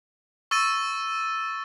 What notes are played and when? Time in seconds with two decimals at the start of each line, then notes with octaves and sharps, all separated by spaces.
0.51 C#6 E6 A6 D#7